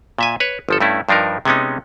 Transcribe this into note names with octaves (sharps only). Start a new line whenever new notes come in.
A#2 E5 G#5
B4 C#5
G1 F3 A4
G2 A3 C#4 E4
G2 F3 D4 D#4 A#4
C3 G#3 B3 C#4 D#4